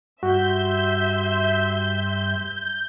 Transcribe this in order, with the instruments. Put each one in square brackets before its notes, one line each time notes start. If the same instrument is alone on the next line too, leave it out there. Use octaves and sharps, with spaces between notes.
[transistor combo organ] G2 [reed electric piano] F#4 [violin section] E5 C6 E6 [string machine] G6